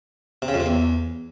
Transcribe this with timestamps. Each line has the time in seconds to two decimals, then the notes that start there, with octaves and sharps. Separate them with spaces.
0.42 C3
0.48 C#3
0.54 F2
0.60 C3
0.66 E2